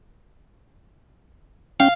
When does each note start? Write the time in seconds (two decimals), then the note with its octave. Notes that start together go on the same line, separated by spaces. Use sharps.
1.80 C#4 F5 G5